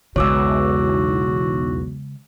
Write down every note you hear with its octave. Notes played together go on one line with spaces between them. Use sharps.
B1 E2 C#3 G#3 F#4 C#5 D6 E6